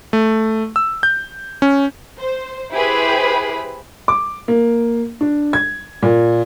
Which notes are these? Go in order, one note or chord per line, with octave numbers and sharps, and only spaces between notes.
A3
E6
G6
C#4
C5
E4 G4 G#4 B4 C5 B5
D6
A#3
D4
G#6
A#2